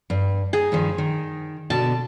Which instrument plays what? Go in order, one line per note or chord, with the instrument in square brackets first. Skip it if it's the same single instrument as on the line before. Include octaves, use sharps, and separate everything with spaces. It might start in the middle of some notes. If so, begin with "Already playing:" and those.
[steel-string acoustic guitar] G2
[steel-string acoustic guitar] D#4 [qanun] G#4
[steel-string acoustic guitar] G2 D#3 F3
D#3
[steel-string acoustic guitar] B2 D3 [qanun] A5